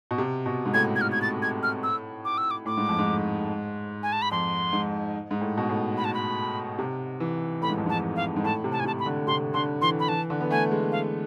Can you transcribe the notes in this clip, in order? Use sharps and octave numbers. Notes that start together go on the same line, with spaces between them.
B2
C3
B2
G#2
A2 G#6
G#6
F6
G#6
A6
G#6
F6
E6
D6
E6
D6
A2 D6
G#2
F2
G#2
G#5
A5
B5
F2 C6
G#2
G#2
A2
B2
A2
B5
A5
B5
C3
E3
A2 B5
G#2
F2
G#2 A5
F5
G#2
A2 A5
C3
A5
G#5
C3 A5
B5
D3
C3 C6
D3 C6
E3 C6
B5
E3 A5
D3
B3
A3 G#5
G#3
F5